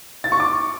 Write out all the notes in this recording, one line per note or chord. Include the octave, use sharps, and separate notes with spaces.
A6
C#6
D6